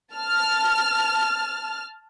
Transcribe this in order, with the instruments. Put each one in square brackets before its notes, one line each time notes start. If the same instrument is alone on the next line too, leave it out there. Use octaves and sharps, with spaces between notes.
[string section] A5 F6